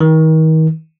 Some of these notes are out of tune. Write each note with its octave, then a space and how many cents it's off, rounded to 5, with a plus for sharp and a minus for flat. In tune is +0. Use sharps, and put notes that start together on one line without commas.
D#3 +35